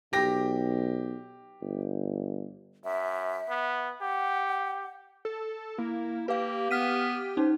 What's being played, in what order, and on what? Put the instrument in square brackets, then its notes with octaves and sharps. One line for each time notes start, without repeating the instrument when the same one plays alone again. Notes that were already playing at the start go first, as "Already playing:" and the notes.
[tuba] B1 [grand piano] G4 A#6
[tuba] G1
[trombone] F#2 [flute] E5
[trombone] B3
[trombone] G4 [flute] F#5
[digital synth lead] A4
[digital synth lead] A#3 [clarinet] E4
[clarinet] A#3 [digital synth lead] G4 [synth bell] B4 F5
[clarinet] B3 [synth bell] F6 B6 D#7
[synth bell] C#4 D#4 [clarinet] C5